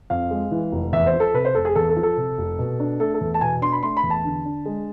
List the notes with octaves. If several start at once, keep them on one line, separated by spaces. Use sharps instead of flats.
F2 F5
G#3
E3
F1
E2 E5
C5
F3
A4
C3 B4
C5
F1 A4
G#4
E2 A4
A4
F3
A4
C3
F1
B2
D4
A3 A4
A4
E2
A5
B2 G#5
D4 C6
B5
A3 C6
B5
E2
A5
D3
D4
G#3